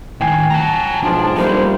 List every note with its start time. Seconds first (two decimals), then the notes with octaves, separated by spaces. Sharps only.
0.21 A2 D#3 G5 G#5 C7
0.51 F#5 A5 A#5
1.03 B1 G#2 F3 D4
1.37 G3 A3 A#3 D#4 F4 C5